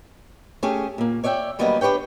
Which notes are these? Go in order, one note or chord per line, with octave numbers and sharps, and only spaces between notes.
A3 C#4 G4 G#4
A#2 A#3
C#5 D5 E5 F#5 G5
D2 F#3 G3 A#3 B3 D#5
D4 G4 B4 C#5 G5